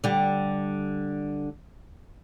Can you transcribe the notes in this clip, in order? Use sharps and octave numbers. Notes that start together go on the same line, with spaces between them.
D3 G3